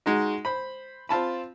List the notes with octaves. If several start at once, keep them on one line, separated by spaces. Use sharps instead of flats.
G#3 D#4 F#4
C5 B5
C4 F4 A5 B5